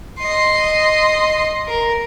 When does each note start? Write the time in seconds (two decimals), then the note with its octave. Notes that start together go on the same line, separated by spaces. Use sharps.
0.19 D#5 C6
1.67 A#4